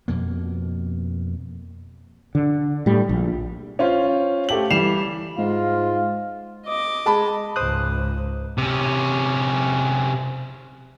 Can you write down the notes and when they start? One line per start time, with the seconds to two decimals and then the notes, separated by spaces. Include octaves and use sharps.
0.08 F2 B2 A#3
2.35 D3
2.86 A2 G3
3.09 A#1
3.79 C#4 F4 C5
4.49 A3 G4 F#7
4.70 E3 G3 C7 E7 F7
5.38 G#2 F4
6.66 D#5 D6
7.06 G#3 A5 B5
7.56 C#2 G#2 C5 D#6 F#6
8.58 C3 C#4